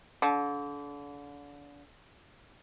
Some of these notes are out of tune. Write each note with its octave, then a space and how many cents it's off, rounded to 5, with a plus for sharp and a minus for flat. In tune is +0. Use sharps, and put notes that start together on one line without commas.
D3 -35